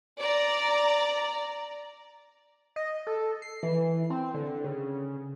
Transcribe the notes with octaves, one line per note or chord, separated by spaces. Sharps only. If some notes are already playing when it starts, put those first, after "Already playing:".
D5 A#5
D#5
A4
C7
E3
C4
D3
C#3